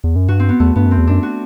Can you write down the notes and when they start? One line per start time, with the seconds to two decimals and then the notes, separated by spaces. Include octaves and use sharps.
0.04 E2
0.16 F#2
0.28 G2 F#4
0.40 C4
0.49 B3
0.60 E2 A3
0.76 G2 B3
0.86 F#2 C4
0.98 E2
1.07 F#2 D4
1.23 F#4